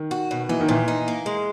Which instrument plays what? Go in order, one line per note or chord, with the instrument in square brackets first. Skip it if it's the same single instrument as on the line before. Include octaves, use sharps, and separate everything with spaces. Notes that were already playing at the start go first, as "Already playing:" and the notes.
Already playing: [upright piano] D#3
[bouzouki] F#4
B2
[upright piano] E3 [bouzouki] D#4
[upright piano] D#3
[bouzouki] A#2 [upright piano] E3
[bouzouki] D#4
A#3
G#3